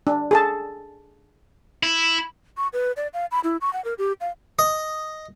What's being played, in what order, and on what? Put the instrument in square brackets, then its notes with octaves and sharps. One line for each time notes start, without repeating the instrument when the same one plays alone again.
[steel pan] D4
G#4 A4 A5
[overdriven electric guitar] E4
[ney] C#6
B4
D5
F5
B5
E4
C#6
F#5
A#4
G4
F5
[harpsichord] D#5